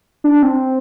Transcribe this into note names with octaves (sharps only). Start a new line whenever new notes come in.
D4
C4